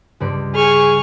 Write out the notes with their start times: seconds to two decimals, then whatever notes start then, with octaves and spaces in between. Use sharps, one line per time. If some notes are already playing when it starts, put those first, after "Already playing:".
0.20 C#2 G2 D5
0.55 G#4 G#5 C#6 F6